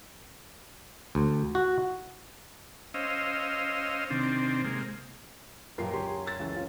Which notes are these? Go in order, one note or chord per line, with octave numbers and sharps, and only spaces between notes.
D2
F#4
C#4 C5 D#5 F5 E6
C3 D#3 C4 D4
C3 G#3 A#3
F#2 A#2 F4 G4 A#4 A5 C7
C#2 C#4 G4 C6
G#4
E6 A6
C#2 E3
C#4 F4